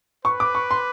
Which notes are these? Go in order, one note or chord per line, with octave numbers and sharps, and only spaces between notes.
B4 C#6
D6
C#6
C6